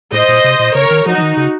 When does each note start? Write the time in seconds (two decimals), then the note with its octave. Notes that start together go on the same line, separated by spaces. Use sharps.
0.12 A2 C5 D#5
0.29 A#2
0.44 C3
0.59 A#2
0.75 C#3 A#4 C#5
0.91 D#3
1.06 F3 D#4 F#4
1.18 F3
1.22 D#3
1.37 C#3